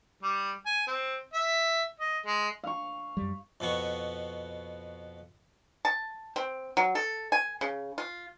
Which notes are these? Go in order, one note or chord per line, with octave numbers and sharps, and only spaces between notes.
G3
G#5
C4
E5
D#5
G#3
F5 C#6
F#2 G3
F2 B2 B3 C#6
A5
C4
F#3
A4
G#5
C#3
F4